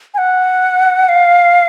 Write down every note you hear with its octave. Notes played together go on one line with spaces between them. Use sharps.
G#5
F#5
F5